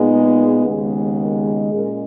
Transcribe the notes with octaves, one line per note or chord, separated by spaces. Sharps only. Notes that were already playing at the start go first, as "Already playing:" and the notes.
Already playing: A#2 G#3 B3 D#4
D#2 C#3 G#3 B3
A#4
A#2 G#3 C#4 A#4